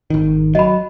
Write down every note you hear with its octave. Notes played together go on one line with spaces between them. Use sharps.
G#1 D#3
F#3 D#5 B5